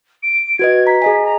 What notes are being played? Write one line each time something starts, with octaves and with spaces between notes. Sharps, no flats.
D7
F#4 B4 D#5 G#6
A#5 B6
G#4 D#5 G#5
A#5